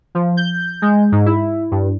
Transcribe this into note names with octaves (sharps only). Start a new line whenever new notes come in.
F3
G6
G#3
G#2
E4
G2